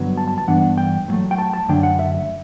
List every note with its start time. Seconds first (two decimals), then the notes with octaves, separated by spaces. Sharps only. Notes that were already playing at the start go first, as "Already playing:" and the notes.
Already playing: G2 D3 F#3 B3
0.17 A5
0.28 A5
0.38 A5
0.48 G2 E3 B3 D4 F#5
0.78 G5
1.08 A2 F#3 A3
1.31 G5
1.38 A5
1.54 A5
1.68 F#2 D3 A3 D4 G5
1.83 F#5
1.99 E5